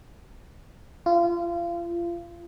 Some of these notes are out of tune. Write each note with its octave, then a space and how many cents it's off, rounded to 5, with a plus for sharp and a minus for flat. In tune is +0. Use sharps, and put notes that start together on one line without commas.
F4 -30